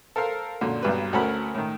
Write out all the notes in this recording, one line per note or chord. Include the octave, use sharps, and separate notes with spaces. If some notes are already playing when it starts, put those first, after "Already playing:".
A4 A#4 C5 F5
F#2 A#2 D3
B1 G2 B4
D2 C#4 A4 A#4 F#5 B5
A2 D#3